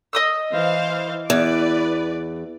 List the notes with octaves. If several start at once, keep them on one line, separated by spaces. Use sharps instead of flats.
D#5 D#6 E6
E3 C5 F5
E2 B4 D5